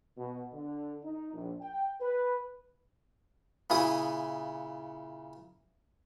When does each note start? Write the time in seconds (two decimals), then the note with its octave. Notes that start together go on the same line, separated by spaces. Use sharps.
0.17 B2
0.52 D3
1.03 D#4
1.32 A#1
1.61 G5
2.01 B4
3.70 A#2 C#3 E4 D#6